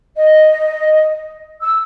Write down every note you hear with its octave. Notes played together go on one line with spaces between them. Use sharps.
D#5
E6